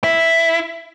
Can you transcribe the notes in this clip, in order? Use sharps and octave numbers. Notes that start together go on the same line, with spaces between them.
E4